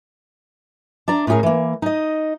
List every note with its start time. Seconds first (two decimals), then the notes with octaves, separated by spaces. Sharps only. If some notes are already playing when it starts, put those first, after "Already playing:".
1.08 D4 D5 A#5
1.27 A2 B3 C#4 G4 G#4 A#4
1.43 E3 A#3
1.82 D#4 D#5